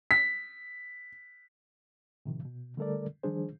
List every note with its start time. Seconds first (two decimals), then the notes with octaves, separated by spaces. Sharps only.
0.11 B6
2.26 A2 C3 D#3 F3
2.45 B2
2.77 D3 G3 A3 A4 A#4 D5
3.23 D#3 F3 G3 D4 G#4 C5